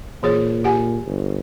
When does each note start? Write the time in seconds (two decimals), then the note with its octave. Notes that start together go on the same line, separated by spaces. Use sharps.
0.23 A#2 E3 G#4 C#5
0.64 G4 F#5 G#5
1.07 G1